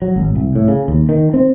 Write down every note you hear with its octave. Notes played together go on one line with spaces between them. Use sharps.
F#3
G#1
C2
A2
C#3
D#2
D#3
C4